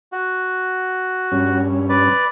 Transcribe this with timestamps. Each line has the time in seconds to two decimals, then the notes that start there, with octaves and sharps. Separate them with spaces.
0.12 F#4
1.32 G2 C#4
1.89 B4 D5